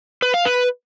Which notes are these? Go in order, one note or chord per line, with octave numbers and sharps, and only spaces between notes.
B4
F5
B4